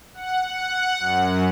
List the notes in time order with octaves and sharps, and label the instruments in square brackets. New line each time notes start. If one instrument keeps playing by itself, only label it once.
[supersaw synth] F#5
F#5
F#2